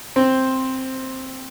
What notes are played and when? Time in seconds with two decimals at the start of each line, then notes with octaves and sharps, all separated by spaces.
0.16 C4 C5